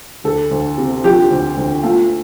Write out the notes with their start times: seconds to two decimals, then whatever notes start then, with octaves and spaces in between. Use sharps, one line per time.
0.24 D2 A4
0.51 D2
0.78 C3
1.04 F3 G4
1.30 D2
1.57 D2
1.83 A3 F4